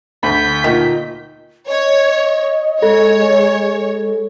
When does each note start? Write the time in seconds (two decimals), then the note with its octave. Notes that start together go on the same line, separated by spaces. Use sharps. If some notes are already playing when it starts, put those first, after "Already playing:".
0.23 D2 B5 G6 B6
0.64 A#2 D#3
1.68 C#5 D#5
2.82 G#3 A4 C#5